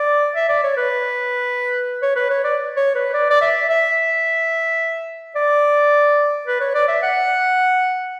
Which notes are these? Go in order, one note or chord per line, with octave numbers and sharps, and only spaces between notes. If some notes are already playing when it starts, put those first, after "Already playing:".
Already playing: D5
E5
D5
C#5
B4
C#5
B4
C#5
D5
C#5
B4
D5
D5
E5
E5
D5
B4
C#5
D5
E5
F#5